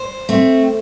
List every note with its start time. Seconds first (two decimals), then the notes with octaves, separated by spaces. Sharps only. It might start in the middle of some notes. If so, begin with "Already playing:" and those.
Already playing: C5
0.29 A3 C4